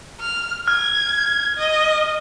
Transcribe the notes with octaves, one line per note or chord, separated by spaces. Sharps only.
F6
F6 G#6
D#5